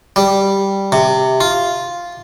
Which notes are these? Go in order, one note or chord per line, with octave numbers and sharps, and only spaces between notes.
G3
C3
F4